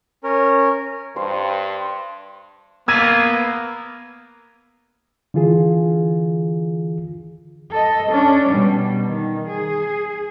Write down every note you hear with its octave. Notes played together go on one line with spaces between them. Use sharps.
C#4 A#4
G2 C5
A#3 B3 A#4 B4 E6 G#6 D#7
D3 E3 F4 G#4
A4 D#5
C#4 D4
B2 G3
D#3
G#4